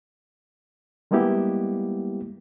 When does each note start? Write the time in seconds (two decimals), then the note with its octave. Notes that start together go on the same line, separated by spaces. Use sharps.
1.11 G3 G#3 A#3 B3 E4 G4